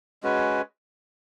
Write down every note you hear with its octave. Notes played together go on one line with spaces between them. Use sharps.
G#3 C#4 F#4 B4